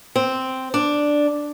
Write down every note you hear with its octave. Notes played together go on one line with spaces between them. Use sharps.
C4
D4